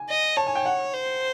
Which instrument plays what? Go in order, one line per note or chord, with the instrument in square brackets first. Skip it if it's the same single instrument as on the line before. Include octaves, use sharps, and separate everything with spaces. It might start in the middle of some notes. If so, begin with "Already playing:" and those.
Already playing: [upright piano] G#5
[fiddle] D#5
[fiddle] C#5 [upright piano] A5
[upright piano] G#5
G5
F#5
[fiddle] C5